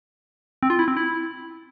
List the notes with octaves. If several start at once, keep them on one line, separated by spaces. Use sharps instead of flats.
C4
F4
E4
C4
E4